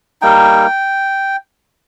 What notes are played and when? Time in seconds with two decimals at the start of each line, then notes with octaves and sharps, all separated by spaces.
0.22 G3 A#3 D#4 G5